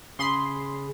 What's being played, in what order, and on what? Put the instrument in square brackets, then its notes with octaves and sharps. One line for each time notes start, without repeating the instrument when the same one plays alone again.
[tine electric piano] C#3 G#4 B5 [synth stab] C6